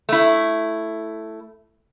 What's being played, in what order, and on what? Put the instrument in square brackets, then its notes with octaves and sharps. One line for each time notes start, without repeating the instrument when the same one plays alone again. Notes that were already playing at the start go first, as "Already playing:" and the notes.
[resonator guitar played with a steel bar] A3 E4